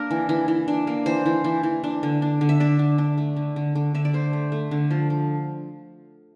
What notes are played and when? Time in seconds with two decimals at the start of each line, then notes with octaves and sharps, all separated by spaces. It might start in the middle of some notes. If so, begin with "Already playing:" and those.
Already playing: A#3 D4 A#4
0.11 E3
0.29 E3
0.48 E3
0.68 D4
0.87 A#3
1.06 E3 C5
1.26 E3
1.44 E3
1.63 E3
1.84 D4
2.03 D3
2.22 D4
2.41 D3
2.49 E5
2.60 D4 D5
2.79 D3
2.98 D4
3.18 A3
3.37 D3
3.56 D3
3.75 D3
3.94 D3 E5
4.05 D5
4.13 A3 C5
4.33 A3
4.52 A3
4.71 D3
4.91 F3
5.10 F3